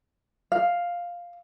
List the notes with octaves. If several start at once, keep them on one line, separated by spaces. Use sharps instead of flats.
F5